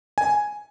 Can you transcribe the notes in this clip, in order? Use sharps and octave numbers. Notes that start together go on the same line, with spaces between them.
G#5